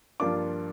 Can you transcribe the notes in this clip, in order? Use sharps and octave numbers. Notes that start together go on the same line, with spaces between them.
G2 F3 A#3 D4 F4 D6